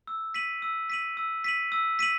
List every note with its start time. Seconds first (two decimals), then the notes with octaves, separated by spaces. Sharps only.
0.07 E6
0.34 B6 D#7 F#7
0.62 E6
0.90 B6 D#7 F#7
1.17 E6
1.44 B6 D#7 F#7
1.72 E6
1.99 B6 D#7 F#7